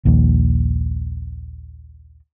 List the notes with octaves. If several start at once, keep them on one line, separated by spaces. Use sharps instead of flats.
A#1 D#2